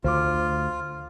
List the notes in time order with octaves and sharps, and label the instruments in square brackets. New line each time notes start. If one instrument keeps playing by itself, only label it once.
[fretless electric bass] D2 [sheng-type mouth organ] F4 [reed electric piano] C5 D6